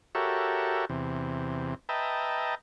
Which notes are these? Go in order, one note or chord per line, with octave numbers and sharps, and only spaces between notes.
F#4 G4 A4 A#4 C#5 E5
E2 C3
B4 D#5 E5 G5 A5 A#5